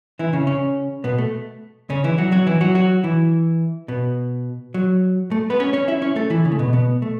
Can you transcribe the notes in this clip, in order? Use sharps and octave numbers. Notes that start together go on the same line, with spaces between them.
E3 E4
C#3 C#4
C#3 C#4
B2 B3
A3
C#3 C#4
E3 E4
F#3 F#4
F#3 F#4
E3 E4
F#3 F#4
F#3 F#4
E3 E4
B2 B3
F#3
A3
B3 B4
C#4 C#5
C#4 C#5
E4 E5
C#4 C#5
A3 A4
E3 E4
C#3 C#4
A3
B2 B3
B2 B3
A3